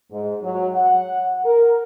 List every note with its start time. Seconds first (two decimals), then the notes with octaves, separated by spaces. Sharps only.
0.11 G#2
0.42 F#3
0.73 F#5
1.45 A#4